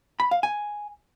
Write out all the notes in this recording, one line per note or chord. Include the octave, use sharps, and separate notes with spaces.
B5
F5
G#5